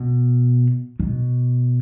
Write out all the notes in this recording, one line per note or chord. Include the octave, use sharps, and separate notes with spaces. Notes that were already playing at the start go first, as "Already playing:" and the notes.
Already playing: B2
B2